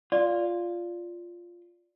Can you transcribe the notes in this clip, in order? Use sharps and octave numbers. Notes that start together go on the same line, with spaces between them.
F4 D5